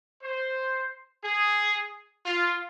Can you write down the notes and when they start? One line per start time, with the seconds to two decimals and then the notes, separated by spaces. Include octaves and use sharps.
0.23 C5
1.24 G#4
2.26 F4